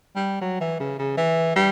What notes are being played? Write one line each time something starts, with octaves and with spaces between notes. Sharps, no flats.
G3
F#3
E3
C#3
C#3
E3
G3